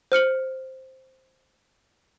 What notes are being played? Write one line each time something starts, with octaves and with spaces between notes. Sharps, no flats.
C5 F6 C#7 F#7